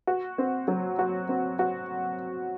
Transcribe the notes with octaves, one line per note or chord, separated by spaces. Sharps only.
F#4
C4
F#3
F#4
C4
F#4